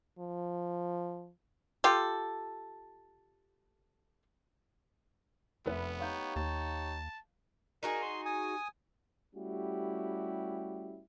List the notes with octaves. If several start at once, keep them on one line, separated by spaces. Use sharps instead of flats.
F3
F4 G4 A4
F1 B3 B4 E5
D#4 G4 C#5 F5 G6
D#2 A5
D#4 F#4 G#4 A#4
C6
G#5 D#6
G3 A3 C#4 E4 F#4 G4